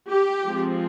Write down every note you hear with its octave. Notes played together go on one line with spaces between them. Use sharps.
G4
F3 G#3 C4